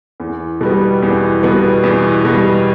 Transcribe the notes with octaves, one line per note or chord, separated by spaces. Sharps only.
E2
B2 G3 B3
E2
B2 G3 B3
E2
B2 G3 B3